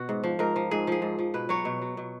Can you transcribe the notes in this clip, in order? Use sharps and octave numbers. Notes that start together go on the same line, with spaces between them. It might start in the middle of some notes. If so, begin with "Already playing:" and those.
Already playing: B2 F#4
G#2
F3
G#2 A#4
F3
G#2 G#4
F3 G#4
G#2
F3
B2 B4
F#3 C#5
B2
F#3
B2